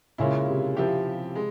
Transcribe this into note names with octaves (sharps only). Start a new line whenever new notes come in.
A#2 C#3 G#3 C#4 E4
C3
F3 C4 E4 G4
G#3